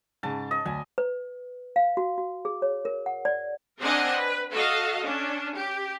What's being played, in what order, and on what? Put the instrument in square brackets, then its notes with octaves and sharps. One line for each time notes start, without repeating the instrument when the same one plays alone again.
[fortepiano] G#2 C#3 [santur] A5
[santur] D#5
[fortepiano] D2 [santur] G#5
[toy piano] B4
F5
F#4
F#4
G#4
C#5
A#4
F#5
D5
[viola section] C4 D4 A#4 D#5 F#5 G#5
B4
F#4 A4 D#5 F5
C#4 D4
G4